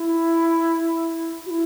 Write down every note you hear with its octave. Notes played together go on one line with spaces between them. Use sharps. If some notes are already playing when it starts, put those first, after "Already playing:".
Already playing: E4
F#4
E4